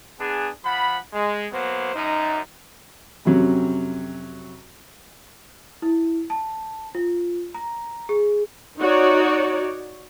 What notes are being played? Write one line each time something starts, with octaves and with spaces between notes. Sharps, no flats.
B3 D4 G#4
F3 F#5 B5
G#3
F#3 A#3 B3 C5
F#2 D#4
F2 C3 F#3 C#4
E4
A5
F4
A#5
G#4
D#4 F#4 C#5 D5